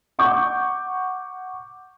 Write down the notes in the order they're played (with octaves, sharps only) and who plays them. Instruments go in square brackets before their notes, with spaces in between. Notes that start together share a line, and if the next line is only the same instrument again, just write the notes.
[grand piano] F#5 C#6 D6 G6